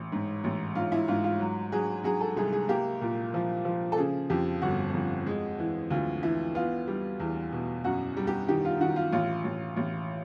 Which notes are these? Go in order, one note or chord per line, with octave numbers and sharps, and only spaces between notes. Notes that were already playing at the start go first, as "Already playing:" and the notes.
Already playing: A1
G#2
A1
G#2 F4
E4
G#2 F4
F4
F#3
F#3 G#4
F#3 G#4
A4
C2 G#4
G#4
A#3 G4
A#2
F3
F3
A4
C#3 G#4
F2 G4
G1 F#4
F2
G#3
E3
D2 F4
E3 E4
B3 F4
G3
E2
B2
F#2 F#4
G3
G4
D#3 G4
F4
D#3 F#4
F4
A1 F4
A1
A1